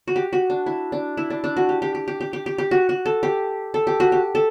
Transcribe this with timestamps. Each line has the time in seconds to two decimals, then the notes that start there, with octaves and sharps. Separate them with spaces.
0.08 F#4
0.16 G4
0.33 F#4
0.50 D4
0.66 E4
0.92 D4
1.17 E4
1.30 D4
1.44 D4
1.57 F#4
1.69 G4
1.82 G4
1.95 G4
2.08 G4
2.21 G4
2.33 G4
2.46 G4
2.58 G4
2.71 F#4
2.89 F#4
3.06 A4
3.23 G4
3.74 A4
3.87 G4
4.00 F#4
4.12 G4
4.35 A4